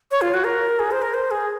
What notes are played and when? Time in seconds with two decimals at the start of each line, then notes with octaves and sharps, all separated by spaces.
0.11 C#5
0.21 F4
0.34 F#4
0.45 A#4
0.79 G#4
0.91 C5
1.02 A#4
1.14 C5
1.31 G#4